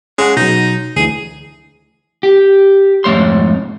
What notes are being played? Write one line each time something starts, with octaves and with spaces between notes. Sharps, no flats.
G#3 C#4 G#4 F#5
B2 F#3 D#4
D2 E3 G#4
G4
F2 G#2 A3 C#5 C6